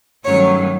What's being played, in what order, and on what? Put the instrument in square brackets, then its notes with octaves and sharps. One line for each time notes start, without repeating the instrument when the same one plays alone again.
[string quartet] G2 D#3 F#3 A3 C#4 C#5